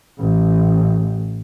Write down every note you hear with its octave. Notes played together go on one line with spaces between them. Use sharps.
A1